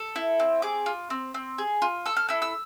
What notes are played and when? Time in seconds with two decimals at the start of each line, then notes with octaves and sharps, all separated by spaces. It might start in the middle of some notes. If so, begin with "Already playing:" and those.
Already playing: A4
0.16 E4
0.40 C4
0.62 G#4 D6
0.86 F4
1.10 C4
1.34 C4
1.58 G#4
1.82 F4
2.06 A4 E6
2.16 F6
2.29 E4 E6
2.42 E6